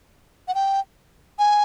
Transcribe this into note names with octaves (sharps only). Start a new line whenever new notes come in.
F#5
G5
G#5